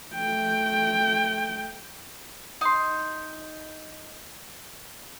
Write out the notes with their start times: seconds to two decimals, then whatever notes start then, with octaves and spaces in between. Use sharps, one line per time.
0.14 A3 G5
2.61 D#4 C6